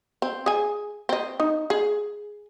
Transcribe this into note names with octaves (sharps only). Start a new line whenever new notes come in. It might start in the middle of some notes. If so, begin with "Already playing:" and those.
C4
G#4 G#5
C4 D#5
D#4
G#4